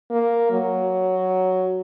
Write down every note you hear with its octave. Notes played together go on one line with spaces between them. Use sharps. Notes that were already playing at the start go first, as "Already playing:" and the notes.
A#3
F#3